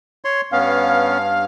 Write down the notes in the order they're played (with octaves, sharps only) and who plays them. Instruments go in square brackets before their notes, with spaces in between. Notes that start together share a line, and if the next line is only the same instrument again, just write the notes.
[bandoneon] C#5 C6
[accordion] G2 F5 [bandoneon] B3 C#4